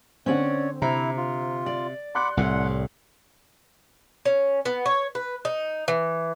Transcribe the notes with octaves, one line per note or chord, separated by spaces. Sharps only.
D3 C4 C#4 C#5 D5 F#5
C3 E4 A#5
F4
D5
F#5 B5 C6 D6 F#6 C#7
C2 A2 F#5
C#4
B3
C#5
B4
D#4
E3